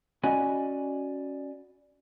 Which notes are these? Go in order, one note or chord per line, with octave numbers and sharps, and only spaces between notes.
C#4 F#4 D5 D#5 G#5 B5